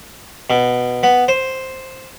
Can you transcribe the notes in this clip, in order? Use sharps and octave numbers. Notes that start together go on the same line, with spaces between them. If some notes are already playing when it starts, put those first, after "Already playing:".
B2
B3
C5